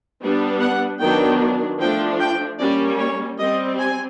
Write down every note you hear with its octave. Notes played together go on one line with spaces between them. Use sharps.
G3 B3 D4
F#5
D#3 F#3 B3 D4 G5
F3 A3 D4 G5
G5
G3 A#3 C#4 D5
C#5
G3 C4 D#5
G#5